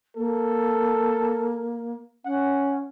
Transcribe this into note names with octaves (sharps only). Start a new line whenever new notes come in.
A#3 A4
C#4 F#5